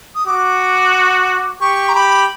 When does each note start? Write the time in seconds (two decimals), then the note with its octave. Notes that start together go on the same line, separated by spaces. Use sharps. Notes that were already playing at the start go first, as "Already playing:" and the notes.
0.15 D#6
0.27 F#4 D6
1.61 G4 C#6
1.89 A#5
1.95 G4 B5